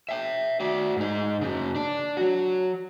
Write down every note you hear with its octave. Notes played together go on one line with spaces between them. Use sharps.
E5 G5
F#4 D5
G#2 D#4
F#2 C#3
D4 D5
F#3 F#4